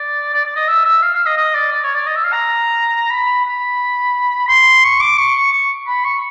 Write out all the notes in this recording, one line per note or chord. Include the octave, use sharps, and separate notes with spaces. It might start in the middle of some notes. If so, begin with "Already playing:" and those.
Already playing: D5
D5
D5
D#5
E5
E5
F5
F5
D#5
D#5
D5
D5
C#5
D5
D#5
E5
F5
A#5
B5
B5
C6
C#6
D6
C#6
C#6
B5
C#6